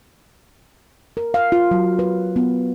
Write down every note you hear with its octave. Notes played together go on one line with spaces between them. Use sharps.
A#4
F5
F4
F#3
B4
B3